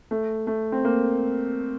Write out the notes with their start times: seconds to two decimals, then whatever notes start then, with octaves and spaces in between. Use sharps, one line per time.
0.11 A3
0.47 A3
0.72 C4
0.85 A#3